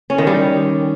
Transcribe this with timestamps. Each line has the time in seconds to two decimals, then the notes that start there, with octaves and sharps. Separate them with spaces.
0.10 C#4
0.18 D#3
0.27 G3